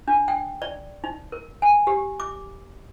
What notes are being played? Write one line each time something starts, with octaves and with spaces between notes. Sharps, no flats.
D4
G5
D5
D#4
A#4
G#5
G4
D6